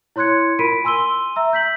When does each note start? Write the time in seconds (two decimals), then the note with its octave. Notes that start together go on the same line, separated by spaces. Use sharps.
0.16 E4 C#5 C6 F#6 G#6 C#7
0.59 F4 A#4 B5 B6 D7 D#7
0.84 G#5 C6 E6 D#7 G7
1.36 E5 A#5 E6
1.53 G6 B6 F#7